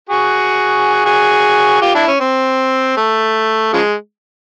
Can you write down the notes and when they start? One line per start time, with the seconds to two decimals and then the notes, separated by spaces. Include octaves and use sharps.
0.09 F#4 G#4
1.05 F#4 G#4
1.82 F4 G4
1.95 D4 E4
2.07 C#4
2.20 C4
2.97 A3
3.73 C#3 F3 G#3